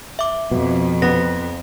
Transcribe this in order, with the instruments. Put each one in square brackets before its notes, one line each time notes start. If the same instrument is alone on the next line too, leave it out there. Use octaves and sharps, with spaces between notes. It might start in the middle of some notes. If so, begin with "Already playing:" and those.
[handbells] E5 D6
[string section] F2 [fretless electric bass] B2
[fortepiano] B3 [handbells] A#6